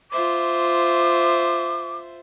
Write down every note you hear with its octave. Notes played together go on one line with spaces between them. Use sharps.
F4 C5 E5 D6